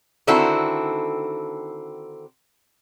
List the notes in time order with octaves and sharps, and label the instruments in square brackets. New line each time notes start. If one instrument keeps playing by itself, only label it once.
[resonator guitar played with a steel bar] D3 D#3 C4 E4 F#4 A4